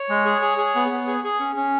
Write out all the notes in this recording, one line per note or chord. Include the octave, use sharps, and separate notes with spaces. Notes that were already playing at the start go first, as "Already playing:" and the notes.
Already playing: C#5
G#3
G#4
G#4
G#4
B3
B3
G#4
G#4
C#4
C#4